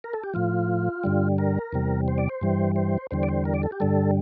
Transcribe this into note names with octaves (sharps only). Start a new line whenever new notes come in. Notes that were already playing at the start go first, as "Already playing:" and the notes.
A#4
A4
G4
A2 F3 F4
G2 D3 G3
A#4
E2 C3 G3
C5
D5
C5
G2 E3 G3
C5
E2 D3 G3 C5
D5
C5
A#4
D5
A4
G4
G2 D3 G3 A4